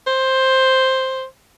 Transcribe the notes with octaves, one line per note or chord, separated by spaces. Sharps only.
C5